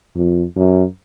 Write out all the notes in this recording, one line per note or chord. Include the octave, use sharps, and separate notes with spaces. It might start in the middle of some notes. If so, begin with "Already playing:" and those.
F2
F#2